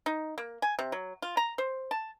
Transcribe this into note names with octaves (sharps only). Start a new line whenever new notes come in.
D#4
A#3
G#5
C3
F#3
F4
A#5
C5
A5